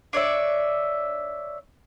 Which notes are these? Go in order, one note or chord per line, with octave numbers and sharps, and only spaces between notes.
D4 C#5 D5 E5